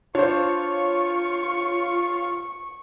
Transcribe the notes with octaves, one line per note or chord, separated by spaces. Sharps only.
D4 F4 C5 C#5 C#6